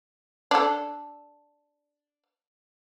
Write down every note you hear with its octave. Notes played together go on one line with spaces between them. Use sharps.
D4 A4